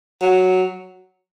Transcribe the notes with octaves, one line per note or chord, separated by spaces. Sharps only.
F#3